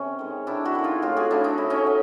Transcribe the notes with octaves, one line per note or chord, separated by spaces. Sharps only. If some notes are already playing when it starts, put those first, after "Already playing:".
Already playing: C3 C#4
D#3 G#3
C3 D4 E4
E4 F#4
D#3 G#3
D#4 F4
A2 F4 G4
F#4 G#4
F#3 A3 D4 E4
D#4
A2 E4
C#4 D#4
F#3